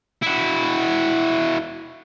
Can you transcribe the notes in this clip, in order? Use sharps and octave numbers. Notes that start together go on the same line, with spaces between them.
E4 F#4